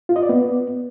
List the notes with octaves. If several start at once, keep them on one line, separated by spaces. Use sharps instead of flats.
F4
D#5
D5
B3